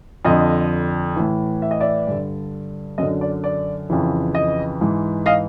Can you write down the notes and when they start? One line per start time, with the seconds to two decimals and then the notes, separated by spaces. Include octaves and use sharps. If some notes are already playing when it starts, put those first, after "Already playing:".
0.25 F2 D3 D#5
1.16 A2 E3
1.62 E5
1.71 D#5
1.80 D5 E5
2.07 G2 D3
2.98 F#2 D3 D#5
3.21 D5
3.44 D5
3.90 F2 C#3 E3
4.35 D#5
4.81 G#2 E3
5.26 D#5 F5